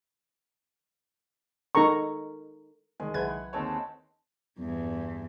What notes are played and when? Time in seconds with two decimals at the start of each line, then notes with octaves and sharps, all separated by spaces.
1.75 D#4 A4 A#4 A#5 C#6
3.00 C2 D#3 G#3 G#5
3.14 B1 C#3 E4 B4 F#5 G#6
3.53 D#2 G#3 C4 C#5 A5 E6
4.59 E2 G2